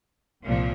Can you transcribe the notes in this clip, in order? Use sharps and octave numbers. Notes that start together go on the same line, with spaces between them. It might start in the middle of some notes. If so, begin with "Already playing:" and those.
C2 A#2 F3